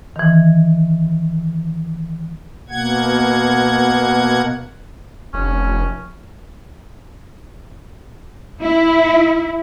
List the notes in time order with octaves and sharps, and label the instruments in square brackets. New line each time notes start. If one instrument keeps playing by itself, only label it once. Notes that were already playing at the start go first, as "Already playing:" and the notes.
[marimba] D#3 E3
[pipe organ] B2 A#3 F#5 G#6
[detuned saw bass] F1 [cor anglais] C#4
[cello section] E4